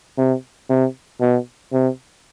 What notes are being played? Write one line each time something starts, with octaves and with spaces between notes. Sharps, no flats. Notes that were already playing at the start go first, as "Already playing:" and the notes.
C3
C3
B2
C3